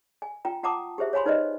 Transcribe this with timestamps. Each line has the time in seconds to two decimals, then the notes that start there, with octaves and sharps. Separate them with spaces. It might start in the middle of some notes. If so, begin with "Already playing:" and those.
0.22 G#5
0.45 F4 G5 A#5
0.63 F4 F#5 A5 A#5 D6 D#6
0.98 G4 G#4 C5 E5
1.13 C#5 F5 G#5 B5 C6
1.26 D#4 B4 C5 D5 D#5